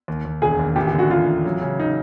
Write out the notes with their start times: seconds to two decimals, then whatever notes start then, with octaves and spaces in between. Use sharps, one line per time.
0.08 D#2
0.25 D#2
0.42 E1 G#4
0.59 D#2
0.76 A1 G4
0.87 G4
0.94 D3
0.99 F#4
1.11 A1 F4
1.28 A1
1.45 F#3
1.62 C#3
1.80 D#4